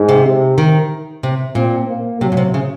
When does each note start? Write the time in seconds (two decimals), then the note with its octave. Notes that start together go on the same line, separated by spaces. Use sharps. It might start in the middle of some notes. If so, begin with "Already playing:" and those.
Already playing: G#2
0.09 C3
0.24 C3
0.58 D#3
1.23 C3
1.55 A#2 C4
1.88 A#3
2.21 C3 F#3
2.32 A#2
2.37 C3
2.54 C#3